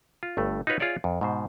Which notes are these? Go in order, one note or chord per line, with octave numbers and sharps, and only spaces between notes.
F4
G1 G2 A3
D#4 F4 F#4 B4 C#5
F4 G#4 C#5 D5 E5
F2
G#2 B2 C5